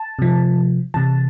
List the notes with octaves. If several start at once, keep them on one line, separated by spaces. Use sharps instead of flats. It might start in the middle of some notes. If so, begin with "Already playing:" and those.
Already playing: A5
C3 F3
C3 E3 A5